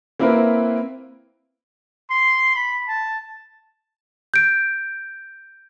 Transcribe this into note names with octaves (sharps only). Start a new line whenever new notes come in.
A#3 C4 E4 A#4 B4
C6
B5
A5
G6 D7